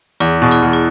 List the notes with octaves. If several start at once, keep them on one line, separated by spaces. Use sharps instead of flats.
E2 E4 G#4
B2
E4 G#4
E2
E4